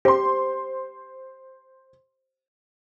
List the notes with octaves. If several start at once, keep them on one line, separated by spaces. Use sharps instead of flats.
G4 C5 C6